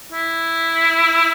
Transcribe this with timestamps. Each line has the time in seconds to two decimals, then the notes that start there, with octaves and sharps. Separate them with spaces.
0.12 E4